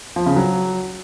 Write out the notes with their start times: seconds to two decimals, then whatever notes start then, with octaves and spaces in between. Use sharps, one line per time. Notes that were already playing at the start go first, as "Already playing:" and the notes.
0.16 F3
0.26 C#3
0.36 F#3